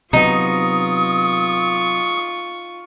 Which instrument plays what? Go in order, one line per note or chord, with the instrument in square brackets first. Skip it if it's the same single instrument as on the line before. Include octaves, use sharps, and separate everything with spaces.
[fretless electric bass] C3 F#3 B3 [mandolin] D#4 [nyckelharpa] F4 C#6 [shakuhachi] D#6